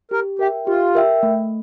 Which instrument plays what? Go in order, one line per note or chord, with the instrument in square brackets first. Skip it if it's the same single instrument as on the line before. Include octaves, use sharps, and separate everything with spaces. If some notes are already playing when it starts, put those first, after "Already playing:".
[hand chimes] G4 [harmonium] A#4
[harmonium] G4 [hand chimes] A#4 E5 G5
[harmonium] F4 [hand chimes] G4
[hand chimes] A#4 E5 G5
A3